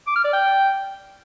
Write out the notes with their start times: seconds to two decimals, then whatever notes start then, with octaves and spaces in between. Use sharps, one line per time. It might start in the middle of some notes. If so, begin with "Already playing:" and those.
0.07 D6
0.16 F6
0.24 D5
0.33 G5